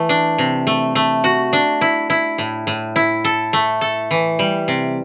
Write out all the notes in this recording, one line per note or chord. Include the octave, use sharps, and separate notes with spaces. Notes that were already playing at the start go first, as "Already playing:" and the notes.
Already playing: E3 A3
D4
C3
A3
A3
F#4
D4
E4
E4
A2
A2
E4
A4
A3
A4
E3
G3
C3